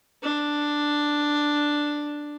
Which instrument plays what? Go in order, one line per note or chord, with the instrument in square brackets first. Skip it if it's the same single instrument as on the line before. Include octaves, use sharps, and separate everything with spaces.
[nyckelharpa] D4